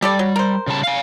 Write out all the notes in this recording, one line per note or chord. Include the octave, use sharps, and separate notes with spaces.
G3 G4 A4 D5
F#3
A#4 C5
C#3 G3 A5
F5 G#5